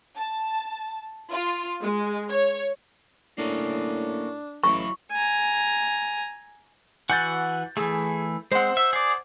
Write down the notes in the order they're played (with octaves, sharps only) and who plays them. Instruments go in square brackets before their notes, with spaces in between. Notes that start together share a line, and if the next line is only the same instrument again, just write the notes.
[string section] A5
F4
G#3
C#5
[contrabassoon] A2 [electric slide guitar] A#3 C#4 [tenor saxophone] D4
[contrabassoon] A1 [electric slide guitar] F#3 E4 [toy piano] C#6
[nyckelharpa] G#5 A#5
[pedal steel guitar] E3 F#4 F#5 [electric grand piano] G#5 G6 A6
[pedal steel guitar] E3 A3 [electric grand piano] G#4
[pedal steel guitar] G#3 C4 [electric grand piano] C5 F#5
[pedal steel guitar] E5
G#4 D5